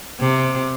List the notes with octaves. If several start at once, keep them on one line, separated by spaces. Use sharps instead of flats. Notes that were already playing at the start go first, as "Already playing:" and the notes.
C3